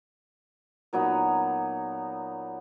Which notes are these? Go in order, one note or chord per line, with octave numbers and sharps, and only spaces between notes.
A#2 F#3 B3 D#4